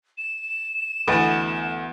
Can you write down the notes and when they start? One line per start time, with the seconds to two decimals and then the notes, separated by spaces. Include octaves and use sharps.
0.18 E7
1.08 D2 E3 B3 A4 D#5 F#5 G#5